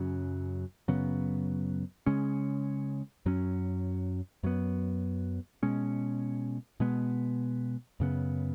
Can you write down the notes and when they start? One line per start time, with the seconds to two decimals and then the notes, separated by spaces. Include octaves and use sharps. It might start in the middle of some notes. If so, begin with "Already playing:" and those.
Already playing: F#2 C#3 F#3
0.88 F#2 C#3 F#3 B3
2.06 C#3 G#3 C#4
3.26 F#2 F#3 C#4
4.43 F#2 F#3 B3
5.63 B2 G#3 C#4
6.80 B2 G#3 B3
8.00 F#2 C#3 B3